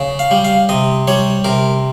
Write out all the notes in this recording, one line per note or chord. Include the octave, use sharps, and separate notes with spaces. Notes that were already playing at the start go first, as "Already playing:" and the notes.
Already playing: C#3
F5
G3
F5
C3 D#5
G3 C#5
C3 A#4